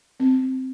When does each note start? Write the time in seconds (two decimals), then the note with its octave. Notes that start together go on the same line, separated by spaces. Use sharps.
0.20 C4